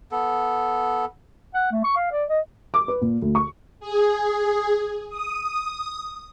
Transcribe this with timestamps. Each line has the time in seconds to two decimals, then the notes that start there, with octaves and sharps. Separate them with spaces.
0.12 B3 A4
1.54 F#5
1.72 A3
1.84 C#6
1.96 F5
2.11 D5
2.29 D#5
2.74 D6
2.88 B4
3.01 A#2
3.22 D2
3.35 C#6
3.80 G#4
5.09 D#6